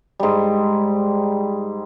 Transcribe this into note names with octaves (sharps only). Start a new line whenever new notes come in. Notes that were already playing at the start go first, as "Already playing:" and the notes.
G#2 G3